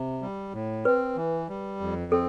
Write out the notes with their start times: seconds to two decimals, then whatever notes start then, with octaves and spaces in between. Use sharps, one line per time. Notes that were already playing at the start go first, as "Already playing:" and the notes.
Already playing: C3
0.22 G3
0.54 A2
0.85 C4 B4
1.16 E3
1.49 G3
1.81 F2
2.12 C4 A4